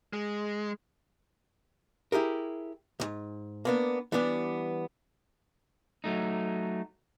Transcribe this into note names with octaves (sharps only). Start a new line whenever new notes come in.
G#3
E4 G4 G#4 A#4
C2 G#2
A#3 B3 D4
E3 G3 B3 D4
F#3 A3 D#4